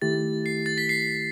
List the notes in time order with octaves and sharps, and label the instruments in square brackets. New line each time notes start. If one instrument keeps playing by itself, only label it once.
[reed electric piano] D#3 A3 E4 G4 [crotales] A6
[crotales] C7
A6
B6
C7